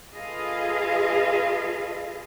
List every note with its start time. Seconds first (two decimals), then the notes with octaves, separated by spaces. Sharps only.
0.15 F4 G#4 A4 B4 D#5 F5